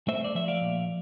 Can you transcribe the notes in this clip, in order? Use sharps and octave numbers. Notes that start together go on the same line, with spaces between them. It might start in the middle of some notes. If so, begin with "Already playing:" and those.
A3 C5 E5
D5
F3 E5
D5 F5
A#2